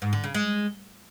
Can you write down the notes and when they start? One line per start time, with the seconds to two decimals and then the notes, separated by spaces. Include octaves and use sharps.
0.02 G#2
0.13 D3
0.24 C#3
0.34 G#3